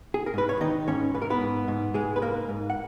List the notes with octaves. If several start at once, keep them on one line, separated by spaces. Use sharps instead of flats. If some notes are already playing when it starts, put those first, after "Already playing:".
G#4
A#4
G#2 B4
C#5
D#3 D#4 D#5
G#2 C#4 C#5
G#2 B4
A#4
B3 B4
G#2
G#2
G#2 G#3 G#4
B4
G#2 A#3 A#4
G#2
F#5